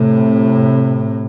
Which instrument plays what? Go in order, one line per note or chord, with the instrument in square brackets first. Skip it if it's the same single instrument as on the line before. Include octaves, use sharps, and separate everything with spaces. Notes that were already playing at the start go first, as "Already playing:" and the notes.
Already playing: [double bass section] A2 C3